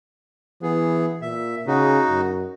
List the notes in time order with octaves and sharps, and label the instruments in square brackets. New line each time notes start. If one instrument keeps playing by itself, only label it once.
[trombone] E3 [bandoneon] B3 G#4
[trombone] A#2 [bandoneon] E5
[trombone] C#3 [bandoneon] D#4 F#4
[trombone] F#2